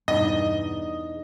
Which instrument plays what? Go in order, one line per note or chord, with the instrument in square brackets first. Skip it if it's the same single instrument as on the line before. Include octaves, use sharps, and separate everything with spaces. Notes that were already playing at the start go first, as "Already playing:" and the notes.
[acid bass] E2 [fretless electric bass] G2 B2 [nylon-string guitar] D4 D#4 [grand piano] D#5